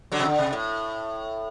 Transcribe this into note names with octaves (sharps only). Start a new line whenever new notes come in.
D3 F#3
C3
D3
C3
A2